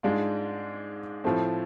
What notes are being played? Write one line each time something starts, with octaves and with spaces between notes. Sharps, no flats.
G#2 G#3 D4 F4
A2 F3 A3 C4